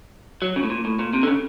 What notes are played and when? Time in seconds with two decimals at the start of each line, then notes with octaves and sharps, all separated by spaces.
0.42 F#3
0.56 C#3
0.63 A2
0.70 A#2
0.85 A2
0.99 A#2
1.13 C3
1.23 D3
1.27 C#3